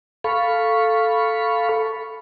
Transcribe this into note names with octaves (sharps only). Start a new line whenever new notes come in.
A4 F5 B5 C#6